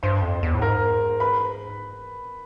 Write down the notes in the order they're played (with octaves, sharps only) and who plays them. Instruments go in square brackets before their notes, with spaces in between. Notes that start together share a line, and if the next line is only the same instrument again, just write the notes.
[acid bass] G2 [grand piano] C5 C6
[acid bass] F2
E2
A2
[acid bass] G#2 [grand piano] A#4 A#5
[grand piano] B4 B5